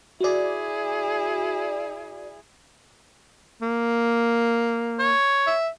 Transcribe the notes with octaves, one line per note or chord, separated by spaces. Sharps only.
E4 F#4 G#4 D5
A#3
C#5
E5